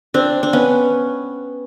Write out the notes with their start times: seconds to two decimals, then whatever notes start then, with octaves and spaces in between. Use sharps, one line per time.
0.14 C4 D4
0.43 D4
0.53 B3 C#4